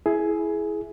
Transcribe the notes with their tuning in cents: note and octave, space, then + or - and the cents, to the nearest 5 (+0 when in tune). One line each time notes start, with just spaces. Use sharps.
E4 +0 G#4 +15